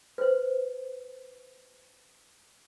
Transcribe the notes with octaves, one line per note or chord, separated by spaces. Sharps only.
B4 C5